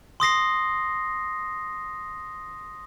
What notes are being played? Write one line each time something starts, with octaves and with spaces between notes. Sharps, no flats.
C6 D#6 A#6 C7